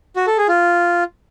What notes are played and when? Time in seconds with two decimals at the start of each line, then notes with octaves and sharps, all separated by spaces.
0.16 F#4
0.27 A4
0.38 G#4
0.48 F4